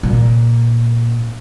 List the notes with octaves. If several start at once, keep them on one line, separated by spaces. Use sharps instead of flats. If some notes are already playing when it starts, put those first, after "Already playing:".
A#2